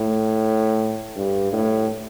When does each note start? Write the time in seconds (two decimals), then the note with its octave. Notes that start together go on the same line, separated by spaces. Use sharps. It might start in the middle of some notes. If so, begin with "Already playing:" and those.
Already playing: A2
1.16 G2
1.53 A2